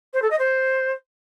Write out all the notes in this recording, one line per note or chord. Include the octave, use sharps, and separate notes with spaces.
C5
A4
D#5
C5